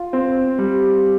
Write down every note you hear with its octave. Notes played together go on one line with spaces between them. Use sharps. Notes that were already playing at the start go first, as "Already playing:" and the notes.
Already playing: F4
C4
G3